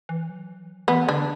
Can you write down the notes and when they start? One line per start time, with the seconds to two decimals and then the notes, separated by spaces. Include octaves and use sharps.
0.09 E3
0.30 F#3
0.88 E3 B3
1.08 D3 D4